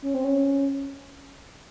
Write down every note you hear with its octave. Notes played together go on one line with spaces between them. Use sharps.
C#4
C4
C#4